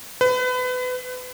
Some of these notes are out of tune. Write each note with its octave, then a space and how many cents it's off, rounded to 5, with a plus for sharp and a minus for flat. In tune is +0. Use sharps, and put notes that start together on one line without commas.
B4 +30